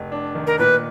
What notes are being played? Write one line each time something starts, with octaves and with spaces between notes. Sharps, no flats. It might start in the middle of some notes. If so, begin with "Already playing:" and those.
Already playing: F1
D4
D#3
A#4
A#2 B4